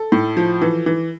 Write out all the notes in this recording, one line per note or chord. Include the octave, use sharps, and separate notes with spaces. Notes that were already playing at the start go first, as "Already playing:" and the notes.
Already playing: A4
A2
F3
E3
E3